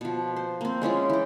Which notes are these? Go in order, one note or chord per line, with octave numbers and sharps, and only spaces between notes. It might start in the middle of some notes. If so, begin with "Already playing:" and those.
B2 F3
C5
A#3 C4
G#3 C#4 E4 F4
E3 G5